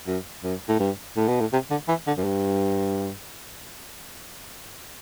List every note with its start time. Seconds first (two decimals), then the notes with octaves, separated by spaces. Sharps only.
0.07 F#2
0.44 F#2
0.69 A2
0.80 G2
1.17 A2
1.28 B2
1.41 A2
1.53 C3
1.71 D3
1.89 E3
2.07 D3
2.18 F#2
2.24 G2